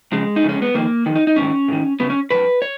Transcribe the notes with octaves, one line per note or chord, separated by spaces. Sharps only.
F2 C#3 G#3
D#4
F2 C#3
C#4
B3
F2 D#3 A#3
F2 D#3
D#4
D#4
G#2 D#3 C#4
G#2 D#3
F#2 C#3 B3
C#4
F#2 C#3 B4
C#5